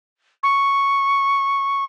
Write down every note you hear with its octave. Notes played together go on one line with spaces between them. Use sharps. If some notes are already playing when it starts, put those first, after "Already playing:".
C#6